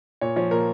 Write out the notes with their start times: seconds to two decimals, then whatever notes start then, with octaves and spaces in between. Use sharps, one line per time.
0.21 A#2 C#5
0.36 F3 C#5
0.51 A#2 A#4